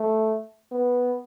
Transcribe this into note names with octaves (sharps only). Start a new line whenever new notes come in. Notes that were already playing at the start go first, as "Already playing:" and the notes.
Already playing: A3
B3